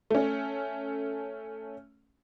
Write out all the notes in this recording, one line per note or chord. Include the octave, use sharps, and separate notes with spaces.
A3 C#4